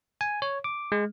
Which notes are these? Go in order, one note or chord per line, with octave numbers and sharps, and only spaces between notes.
G#5
C#5
D6
G#3